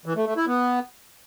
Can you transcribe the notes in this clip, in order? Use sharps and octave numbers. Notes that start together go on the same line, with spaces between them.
E3
A3
A3
E4
B3